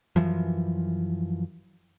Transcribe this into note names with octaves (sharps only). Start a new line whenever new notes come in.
F#2 C#3 E3 F3